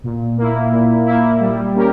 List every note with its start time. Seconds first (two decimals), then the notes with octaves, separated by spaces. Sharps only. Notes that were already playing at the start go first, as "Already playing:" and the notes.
0.04 A#2
0.38 A#3 E4
0.72 A#2
1.06 A#3 E4
1.40 G3
1.75 A#3 C#4 G4 A#4